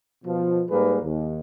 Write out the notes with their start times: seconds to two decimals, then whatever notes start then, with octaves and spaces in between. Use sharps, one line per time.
0.25 B2 F3
0.70 G#2 G3 A#3 G#4 B4
1.02 D#2